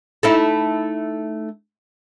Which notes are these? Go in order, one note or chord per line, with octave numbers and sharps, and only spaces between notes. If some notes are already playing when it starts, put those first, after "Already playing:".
A3 D#4 E4